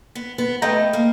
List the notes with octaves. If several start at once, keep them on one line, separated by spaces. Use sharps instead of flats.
B3
B3
A3 B4 D#5 G5 A#5
A#3